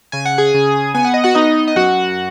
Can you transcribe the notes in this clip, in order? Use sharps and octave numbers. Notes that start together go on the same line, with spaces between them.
C#3 G#5
F#5
G#4 G#5
C#3
B3 G#5
F#5
D#5
F#4 F#5
B3 D#4 D#5
D#5
F#2 F#4 F#5